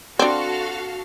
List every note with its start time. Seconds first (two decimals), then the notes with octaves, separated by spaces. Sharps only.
0.19 C4 D4 F#4 A4 F5